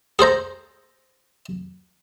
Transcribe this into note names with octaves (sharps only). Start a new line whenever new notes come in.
G#4 A4 C5 A#5